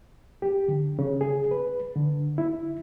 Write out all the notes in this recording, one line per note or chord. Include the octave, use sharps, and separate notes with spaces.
G4
D3
C#3
G#4
B4
D3
E4